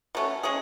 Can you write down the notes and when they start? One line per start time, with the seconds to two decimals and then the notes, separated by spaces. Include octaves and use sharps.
0.15 B2 A3 C#4
0.43 G#3 C#4 G#4